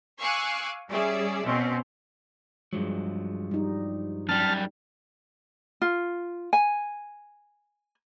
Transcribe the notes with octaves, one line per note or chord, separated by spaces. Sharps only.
F5 G#5 C#6 D6 E6 F#6
G3 C#4 G#4 D5 E5
B2 C4 C#4
G2 F3 F#3 G#3
G3 D#4
F#2 G3 A5 F6
F4
G#5